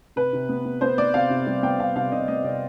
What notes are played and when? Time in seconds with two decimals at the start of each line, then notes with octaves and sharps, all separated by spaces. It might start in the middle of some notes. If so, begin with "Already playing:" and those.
0.16 C3 B4
0.33 C3
0.49 B3
0.65 B3
0.81 B3 C5
0.98 B3 D5
1.14 C3 F5
1.30 C3
1.47 G3
1.63 B3 G5
1.79 C3 F5
1.96 C3 F5
2.12 C3 D#5
2.28 B3 D#5
2.44 C3 D5